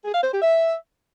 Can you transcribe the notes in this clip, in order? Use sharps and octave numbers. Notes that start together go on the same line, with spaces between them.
G#4
F5
C5
G4
E5